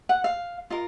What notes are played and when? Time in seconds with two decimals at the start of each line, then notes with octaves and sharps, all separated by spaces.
0.09 F#5
0.24 F5
0.70 F4 A#4 D#5